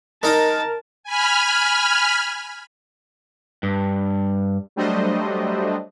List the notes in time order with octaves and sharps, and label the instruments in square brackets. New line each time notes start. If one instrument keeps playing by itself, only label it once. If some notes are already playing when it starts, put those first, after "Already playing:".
[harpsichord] G#3 D#4 D#5 [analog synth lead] A#4 [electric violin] A5
[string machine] G#5 B5 F6
[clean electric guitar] G2
[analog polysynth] F#3 G3 A3 D4 C5 D#5